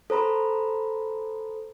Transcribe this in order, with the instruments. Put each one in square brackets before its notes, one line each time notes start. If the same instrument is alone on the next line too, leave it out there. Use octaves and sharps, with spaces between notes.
[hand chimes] A4 C5 A#5 B5